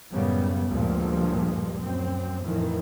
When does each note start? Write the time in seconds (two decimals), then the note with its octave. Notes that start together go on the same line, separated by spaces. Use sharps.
0.11 F#2 A2 C#3 G3 B3
0.71 D2 G2 A#2 F3 G#3
1.80 F#2 C4
2.45 F2 A2 D#3 E3